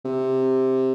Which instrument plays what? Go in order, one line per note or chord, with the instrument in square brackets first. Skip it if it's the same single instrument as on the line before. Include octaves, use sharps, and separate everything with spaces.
[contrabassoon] C3